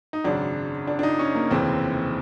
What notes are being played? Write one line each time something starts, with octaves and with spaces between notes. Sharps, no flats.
D#4
G#1 F#2 C#3 D4
D4
D4
D#4
C#4
A#3
F1 D#2 C#3 E3 C4